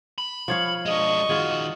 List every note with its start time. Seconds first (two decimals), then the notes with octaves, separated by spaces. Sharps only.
0.18 B5
0.48 F3 C#5 F5
0.86 G#3 D4 D#5 C#6
1.29 D#3 F4 F#4 G#4